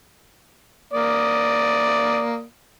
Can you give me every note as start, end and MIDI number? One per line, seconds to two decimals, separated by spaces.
0.93 2.42 58
0.93 2.42 74
0.93 2.42 87